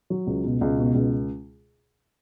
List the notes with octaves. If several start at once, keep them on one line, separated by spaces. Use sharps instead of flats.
F#3
C#2
B2
C#2
B2
C#2